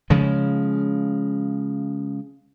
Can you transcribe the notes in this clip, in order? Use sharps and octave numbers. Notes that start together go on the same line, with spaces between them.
C#3 F3 G#3